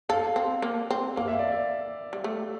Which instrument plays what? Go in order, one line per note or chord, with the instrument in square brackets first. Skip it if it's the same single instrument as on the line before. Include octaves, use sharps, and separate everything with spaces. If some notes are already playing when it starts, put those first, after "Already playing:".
[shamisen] A4 [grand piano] F5
[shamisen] C4
A#3
C4
[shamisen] A#3 [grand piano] F5
[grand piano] E5
D5
E5
[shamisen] G3
A3